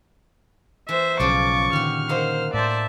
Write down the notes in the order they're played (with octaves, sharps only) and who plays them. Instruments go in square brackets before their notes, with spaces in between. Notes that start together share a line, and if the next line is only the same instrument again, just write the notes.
[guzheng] E3 [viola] C5 E5
[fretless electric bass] B1 [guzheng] C#3 F3 [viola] C#6 [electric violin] D6 A6
[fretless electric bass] A#2 D3 D#3 [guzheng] G4 F#5 [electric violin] F6
[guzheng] A#3 D#4 F#5 [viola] C5
[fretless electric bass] A2 A3 [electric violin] C5 D5 [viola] E5 A5